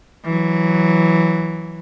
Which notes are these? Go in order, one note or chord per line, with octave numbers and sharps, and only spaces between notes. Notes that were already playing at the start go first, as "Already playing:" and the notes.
E3 F#3